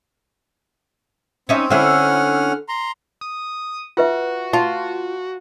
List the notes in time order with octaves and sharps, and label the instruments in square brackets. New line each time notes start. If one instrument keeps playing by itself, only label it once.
[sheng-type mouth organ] C4 [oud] C#4 D#4 E5
[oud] D3 C4 E4 [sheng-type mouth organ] C#4 F#5 F6
[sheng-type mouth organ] A#5 C6
[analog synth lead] D#6
[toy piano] F4 B4 E5 [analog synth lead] F#4
[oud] F4 [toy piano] A5